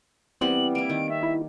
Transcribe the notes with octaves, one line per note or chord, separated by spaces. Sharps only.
E3 G3 B3 C4 F#7
A#3 E4 D7
D#3
E5
E4